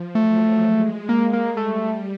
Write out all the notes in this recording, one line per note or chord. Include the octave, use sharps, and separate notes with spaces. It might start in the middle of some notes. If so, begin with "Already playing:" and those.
Already playing: F3
F#3 A3
G#3
A#3
A#3
G3 A3